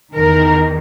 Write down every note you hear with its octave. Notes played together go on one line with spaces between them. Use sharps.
E2 D#3 A#4